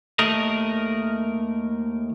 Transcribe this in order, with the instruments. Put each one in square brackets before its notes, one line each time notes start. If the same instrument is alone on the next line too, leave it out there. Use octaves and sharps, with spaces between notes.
[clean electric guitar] D#2 A3 A#4 D#5